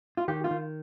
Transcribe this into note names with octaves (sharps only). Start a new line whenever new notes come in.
F4
D#3 G4
F4
D#3